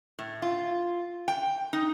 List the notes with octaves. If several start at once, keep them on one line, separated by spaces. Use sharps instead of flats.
A2
F4
G5
D#4